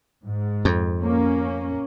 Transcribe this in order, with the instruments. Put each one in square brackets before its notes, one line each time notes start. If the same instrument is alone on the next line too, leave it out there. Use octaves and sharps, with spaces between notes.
[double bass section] G#2
[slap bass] F2
[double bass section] A#3 C#4